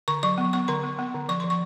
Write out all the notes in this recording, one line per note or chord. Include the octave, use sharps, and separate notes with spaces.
D3 C#6
F#3 C#6
B3
B3 C#6
D3 C6
B3
B3
D3
F3 C#6
F3 C6
C#6